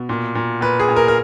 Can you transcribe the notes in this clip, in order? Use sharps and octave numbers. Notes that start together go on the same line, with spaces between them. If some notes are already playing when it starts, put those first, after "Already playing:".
Already playing: B2
A#2
A#2
A#2 B4
G#4
A#2
A#4
A#4